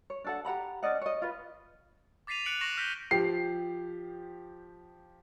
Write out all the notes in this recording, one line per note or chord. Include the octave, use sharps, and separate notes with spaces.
C#5
D4 A4 F#5
G4 F#5 A#5 B5
C#4 D5 D#5 F#5
C#5 D#5
F4 B4
D6 A6 B6 C7 D#7 F7
F#6 C#7 D7 F7 F#7
C#6 A#6 C7 E7 F#7
F6 G6 A#6 B6 D7 G7
F3 G4 C7